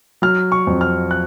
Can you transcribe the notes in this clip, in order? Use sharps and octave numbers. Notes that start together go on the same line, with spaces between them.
F#3 F6
C#6
F2
F6
F#6